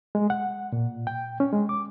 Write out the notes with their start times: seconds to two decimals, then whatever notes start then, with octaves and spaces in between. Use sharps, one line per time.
0.15 G#3
0.30 F#5
0.72 A#2
1.07 G5
1.40 C#4
1.53 G#3
1.69 D6